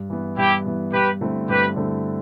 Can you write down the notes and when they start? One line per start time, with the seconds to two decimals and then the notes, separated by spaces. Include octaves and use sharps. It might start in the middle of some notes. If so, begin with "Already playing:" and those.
Already playing: G2
0.10 E3 B3
0.37 G2 E4 G4
0.66 E3 B3
0.93 G2 G4 B4
1.21 D3 A3 C4 E4
1.48 G2 G4 B4
1.76 D3 A3 C4 E4